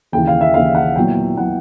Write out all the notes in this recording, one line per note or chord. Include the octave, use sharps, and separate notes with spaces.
D#2 C#3 E3 G5
F5
E5
D#2 C#3 E3 F5
F#5
A#2 F#3 B3 E4 G5
A#2 F#3 B3 E4 F#5